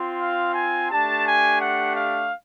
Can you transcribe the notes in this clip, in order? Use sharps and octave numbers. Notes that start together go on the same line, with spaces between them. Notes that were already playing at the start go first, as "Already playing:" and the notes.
Already playing: C4 F4
F5
G#5
A3 D4 G4 A5
G#5
F#5
F5